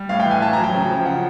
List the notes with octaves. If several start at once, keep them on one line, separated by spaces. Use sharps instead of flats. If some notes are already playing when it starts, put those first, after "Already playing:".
Already playing: G3
A2 F5
G5
E3
G#5
A2 A5
F#3 A#5
G5
C#3
F3
C#3 F#5